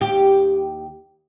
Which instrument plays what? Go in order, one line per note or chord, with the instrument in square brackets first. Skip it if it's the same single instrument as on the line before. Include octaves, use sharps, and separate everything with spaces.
[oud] D#2 G4